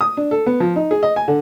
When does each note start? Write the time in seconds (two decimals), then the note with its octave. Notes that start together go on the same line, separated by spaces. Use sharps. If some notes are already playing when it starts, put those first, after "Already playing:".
0.01 D#6
0.17 D4
0.31 A4
0.46 B3
0.60 F3
0.76 D#4
0.91 G#4
1.03 D#5
1.16 G#5
1.28 D3